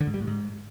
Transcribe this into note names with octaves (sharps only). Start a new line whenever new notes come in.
D3
G#2
G3
A2
G#2